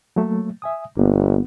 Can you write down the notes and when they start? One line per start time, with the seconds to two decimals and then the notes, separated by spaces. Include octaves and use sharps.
0.16 F#3 A3 A#3
0.62 E5 G#5 D#6
0.97 G1 A#3 B3